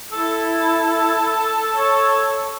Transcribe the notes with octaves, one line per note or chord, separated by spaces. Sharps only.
E4 A4
C#5